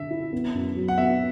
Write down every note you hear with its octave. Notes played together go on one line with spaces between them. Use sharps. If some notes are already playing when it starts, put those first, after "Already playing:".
Already playing: D3 E5
E4
B3
F#2
F#3
F#5
B3 E5